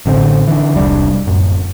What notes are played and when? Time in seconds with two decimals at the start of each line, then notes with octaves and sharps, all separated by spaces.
0.06 A1 D3 F#3 C4
0.47 D3 E3
0.74 E1 C2 G3 D4
1.27 D1 F#2